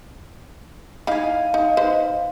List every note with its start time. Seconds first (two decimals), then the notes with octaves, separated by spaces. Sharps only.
1.07 D#4 E4 F5 G#5
1.54 D#4
1.77 D#4 B4 C5